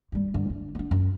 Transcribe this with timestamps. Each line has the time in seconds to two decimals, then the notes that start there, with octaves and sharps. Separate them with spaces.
0.12 G2 G3
0.34 G2 D3
0.50 D4
0.75 B3 D4
0.91 F#2